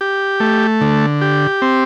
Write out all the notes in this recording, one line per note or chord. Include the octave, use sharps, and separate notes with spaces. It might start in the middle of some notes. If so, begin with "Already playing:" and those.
G4
A3
D3
G4
C4